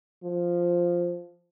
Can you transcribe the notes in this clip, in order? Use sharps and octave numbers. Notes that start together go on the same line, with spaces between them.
F3